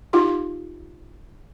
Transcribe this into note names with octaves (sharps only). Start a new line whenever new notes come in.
D#4 F4 G4 F5 C6